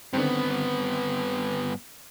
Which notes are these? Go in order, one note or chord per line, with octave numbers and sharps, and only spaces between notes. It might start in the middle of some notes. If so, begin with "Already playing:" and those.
G2 D3 D#3 B3 C4